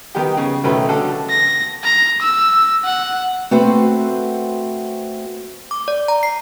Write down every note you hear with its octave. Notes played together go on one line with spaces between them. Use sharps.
D#3 B3 G4
C#3
B1 D#3 A3 C#4 B4
D3 A4
A#6
A#5
E6
F#5
A3 C4 F#4 B4 C5
D6
D5
A#5
C7